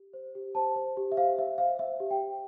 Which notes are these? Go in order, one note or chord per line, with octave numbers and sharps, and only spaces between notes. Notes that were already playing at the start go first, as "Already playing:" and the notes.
Already playing: G4
C5
G4
C5 A5
C5
G4
E5
C5 F5
C5 E5
C5 F5
C5 E5
G4
G5
G4